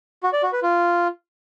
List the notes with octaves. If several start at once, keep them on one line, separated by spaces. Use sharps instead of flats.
F#4
D5
F#4
B4
F4